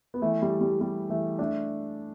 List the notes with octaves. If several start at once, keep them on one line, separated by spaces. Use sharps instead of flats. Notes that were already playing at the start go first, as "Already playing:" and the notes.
B3
E3 A3
G3
G3
G3
E3 A3
A3 D4